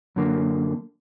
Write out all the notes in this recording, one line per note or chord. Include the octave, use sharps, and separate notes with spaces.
F#2 D3 A#3